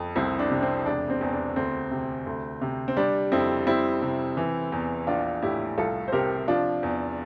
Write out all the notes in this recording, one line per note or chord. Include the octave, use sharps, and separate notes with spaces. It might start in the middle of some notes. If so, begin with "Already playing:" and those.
Already playing: F2
C2 C4 E4
D4
C3
C4
E1 D4
C4
E2
D4
D2 C4
C3
D2
C3
C4
G3 D4
F2 C4 E4
G3 C4 E4
C3
E3
E2
A#1 D4 F4
A2 E4 G4
C2 F4 A4
C5
C3 G4 A#4
F3 D4 F4
E2